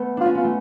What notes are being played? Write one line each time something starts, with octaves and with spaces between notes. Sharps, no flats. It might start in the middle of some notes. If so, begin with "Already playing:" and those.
Already playing: A3 B3
D4 F4
C#4
B3 F4
A3